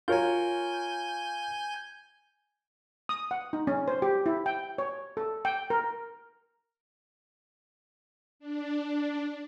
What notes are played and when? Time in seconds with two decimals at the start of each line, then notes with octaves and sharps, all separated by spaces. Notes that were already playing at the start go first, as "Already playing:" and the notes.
0.08 F4 A#4 C#5 G#5 G6
3.09 D#6
3.31 F#5
3.53 D#4
3.67 C#4
3.88 C5
4.02 G4
4.26 E4
4.46 G5
4.78 C#5
5.17 A4
5.45 G5
5.70 A#4
8.39 D4